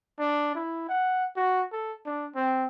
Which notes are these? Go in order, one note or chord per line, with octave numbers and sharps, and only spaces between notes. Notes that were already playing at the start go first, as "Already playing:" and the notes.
D4
E4
F#5
F#4
A4
D4
C4